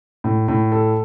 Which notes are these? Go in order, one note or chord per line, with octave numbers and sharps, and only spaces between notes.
A2
A2
A4